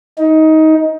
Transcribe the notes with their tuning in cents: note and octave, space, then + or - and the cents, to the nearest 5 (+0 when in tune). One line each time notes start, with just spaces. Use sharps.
D#4 +20